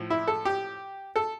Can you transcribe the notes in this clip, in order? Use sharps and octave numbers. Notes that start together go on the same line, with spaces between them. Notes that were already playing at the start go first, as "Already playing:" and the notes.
Already playing: A2 F3
E4
A4
G4
A4